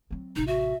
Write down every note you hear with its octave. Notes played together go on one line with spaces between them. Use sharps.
F#3 C4
A1 C3 D#4
F#4 E5